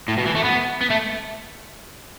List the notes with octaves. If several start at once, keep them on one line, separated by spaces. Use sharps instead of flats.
A2
B2
E3
A3
B3
B3
A3